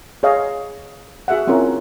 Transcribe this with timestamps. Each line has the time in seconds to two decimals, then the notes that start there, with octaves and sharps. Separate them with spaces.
0.23 G#4 C#5 D#5 F5
1.28 F#4 G#4 E5 F#5
1.47 C4 C#4 E4 F4 A#4